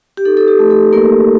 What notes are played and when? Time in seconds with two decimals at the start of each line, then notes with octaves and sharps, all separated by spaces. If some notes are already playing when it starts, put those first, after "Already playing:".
0.17 G4
0.25 D#4 A4
0.37 A4
0.48 G4
0.59 A3
0.70 A4
0.92 A3 A#3 A#4